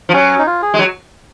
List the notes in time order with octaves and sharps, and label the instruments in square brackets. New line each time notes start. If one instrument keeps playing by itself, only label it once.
[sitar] F3
[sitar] F#3 [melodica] C#4
[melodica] D#4
F4
G#4
[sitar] G#3
F#3